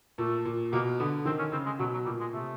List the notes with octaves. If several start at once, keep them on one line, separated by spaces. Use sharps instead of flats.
A#2 A3
A#2
B2 A#3
D3 B3
D#3 C4
C#4
C#3 C4
G#3
B2 F#3
F#3
A#2 G3
G#3
C3 A3